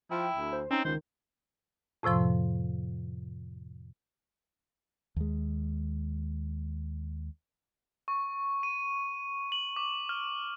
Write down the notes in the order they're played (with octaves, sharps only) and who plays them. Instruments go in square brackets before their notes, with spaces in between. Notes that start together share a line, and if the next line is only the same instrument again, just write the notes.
[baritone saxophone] F3 [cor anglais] E4 [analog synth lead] G5
[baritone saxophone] D2
[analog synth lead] C5
[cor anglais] C4 [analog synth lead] C#4 [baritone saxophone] D#4
[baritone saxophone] C#2 [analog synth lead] D#3 [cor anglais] C5
[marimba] F2 A2 C3 F3 C6
[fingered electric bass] D#2 G#3
[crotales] C#6
D#7
F#7
D6
F6